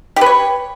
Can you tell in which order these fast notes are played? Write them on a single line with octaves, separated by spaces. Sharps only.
G4 B4 C#5